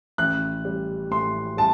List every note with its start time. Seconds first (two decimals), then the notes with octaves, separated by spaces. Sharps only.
0.18 A1 F#6
0.65 G3
1.11 A2 C6
1.57 G3 A5